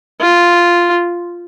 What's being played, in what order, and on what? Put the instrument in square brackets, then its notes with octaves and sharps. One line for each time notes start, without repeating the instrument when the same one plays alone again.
[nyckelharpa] F4